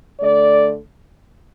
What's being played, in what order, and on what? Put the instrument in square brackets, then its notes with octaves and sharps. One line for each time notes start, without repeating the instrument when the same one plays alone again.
[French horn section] D3 A3 D5